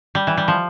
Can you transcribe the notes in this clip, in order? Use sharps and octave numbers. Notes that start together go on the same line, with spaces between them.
G3
E3
G3
F3